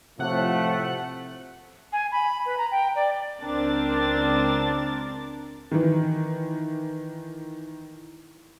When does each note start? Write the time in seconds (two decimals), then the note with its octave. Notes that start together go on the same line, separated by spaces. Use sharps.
0.19 A2 C3 F3 A3 F#5 F#6
1.93 G#5
2.12 B5
2.46 B4
2.58 A#5
2.71 G5
2.96 D5
3.43 C#2 C4 D4 A#4 A6
5.72 D#3 E3